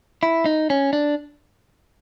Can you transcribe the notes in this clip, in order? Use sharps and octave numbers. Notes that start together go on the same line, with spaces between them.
E4
D#4
C#4
D4